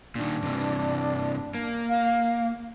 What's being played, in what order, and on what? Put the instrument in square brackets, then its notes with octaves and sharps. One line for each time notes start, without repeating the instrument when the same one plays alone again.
[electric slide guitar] A#2 D#3 [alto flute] D4
[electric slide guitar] G2 C3 E3
A#3
[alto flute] F5